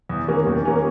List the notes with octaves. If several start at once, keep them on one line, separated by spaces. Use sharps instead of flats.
E2
D#3 A#3 C#4
E2
D#3 A#3 C#4